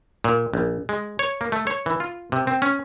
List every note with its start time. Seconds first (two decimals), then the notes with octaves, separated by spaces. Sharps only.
0.24 A#2
0.54 A#1
0.89 G#3
1.19 C#5
1.41 A#3
1.52 A3
1.67 C#5
1.86 E3
2.00 F4
2.32 C3
2.47 C4
2.62 C#4